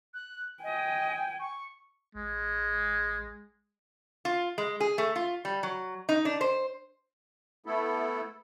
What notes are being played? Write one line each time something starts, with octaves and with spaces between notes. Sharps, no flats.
F#6
D#5 G5 G#5
C#6
A1 G#3
F4
G#3
G#4
A3
F4
G3
F#3
D#4
D4
C5
A3 B3 E4 A4